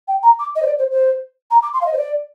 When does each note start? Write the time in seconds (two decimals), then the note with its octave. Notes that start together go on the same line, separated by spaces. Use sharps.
0.08 G5
0.23 A#5
0.39 D6
0.55 D#5
0.62 C5
0.66 D5
0.78 C5
0.91 C5
1.51 A#5
1.62 D6
1.73 C6
1.81 F5
1.86 D#5
1.93 C5
1.97 D5